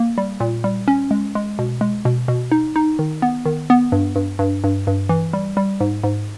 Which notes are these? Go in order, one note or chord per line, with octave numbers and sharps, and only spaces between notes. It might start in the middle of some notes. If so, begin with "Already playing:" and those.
Already playing: A#3
G3
A#2
G3
C#4
G#3
G#3
B2
G#3
B2
B2
D#4
D#4
D#3
B3
D#3
B3
G2
G2
G2
G2
G2
E3
G3
G3
G#2
G#2